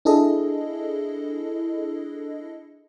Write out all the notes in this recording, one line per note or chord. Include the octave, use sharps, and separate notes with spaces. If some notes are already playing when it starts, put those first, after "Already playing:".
D4 E4 G#4 A4 D#5